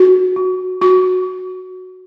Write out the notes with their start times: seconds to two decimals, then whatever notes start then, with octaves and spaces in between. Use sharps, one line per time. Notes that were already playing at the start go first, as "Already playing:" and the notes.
Already playing: F#4
0.36 F#4
0.81 F#4